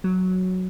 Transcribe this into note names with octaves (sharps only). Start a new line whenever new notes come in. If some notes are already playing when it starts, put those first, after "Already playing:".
F#3